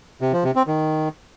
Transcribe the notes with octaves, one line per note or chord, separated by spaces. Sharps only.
C3
F3
C3
C4
D#3